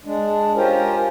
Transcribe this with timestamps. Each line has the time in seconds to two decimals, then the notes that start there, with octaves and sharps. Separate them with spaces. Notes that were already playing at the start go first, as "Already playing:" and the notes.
0.05 G#3 D4
0.56 C#4 F4 G4 A#4 C5